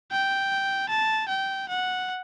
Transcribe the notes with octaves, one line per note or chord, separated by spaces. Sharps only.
G5
A5
G5
F#5